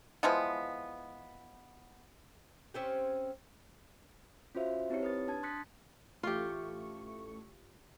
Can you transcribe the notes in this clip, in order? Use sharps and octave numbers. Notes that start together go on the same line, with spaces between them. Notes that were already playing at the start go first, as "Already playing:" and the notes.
E3 F3 G#3 B3
C4 C#4 G4
C#4 F4 F#4 C5 E5 F5
C5
C4 D#4 E4 G4 C#5 C#7
B4 D#6 A6
D4 A5 G#6
C6 D#6 F#6 A6 B6 C#7
A1 A3 F4 G4 C#6